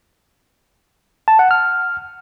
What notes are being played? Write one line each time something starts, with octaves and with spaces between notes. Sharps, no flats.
A5
F#5
F6